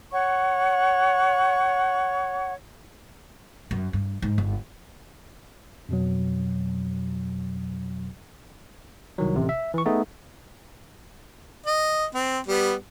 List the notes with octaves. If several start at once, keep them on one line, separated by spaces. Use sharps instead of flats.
C#5 F#5 C#6
F#2
G2
G#2
G1
F2 B2 F#3
C2 D#3 F#3
A1 C3
E5
E3 C#6
A3 B3 D#4 G#4
D#5
C4
G3 B3